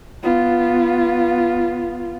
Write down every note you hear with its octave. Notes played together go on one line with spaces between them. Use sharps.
B3 F4